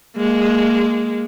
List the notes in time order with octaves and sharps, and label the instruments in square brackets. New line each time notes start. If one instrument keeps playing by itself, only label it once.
[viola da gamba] G#3 A#3